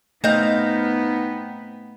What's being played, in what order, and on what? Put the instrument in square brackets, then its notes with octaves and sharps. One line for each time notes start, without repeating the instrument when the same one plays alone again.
[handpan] A3 D#5 [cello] B3 [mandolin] C4 F5 G6 [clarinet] D#4